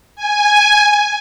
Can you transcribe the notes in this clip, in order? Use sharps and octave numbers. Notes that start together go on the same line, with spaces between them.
G#5